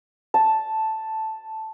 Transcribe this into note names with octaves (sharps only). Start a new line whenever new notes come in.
A5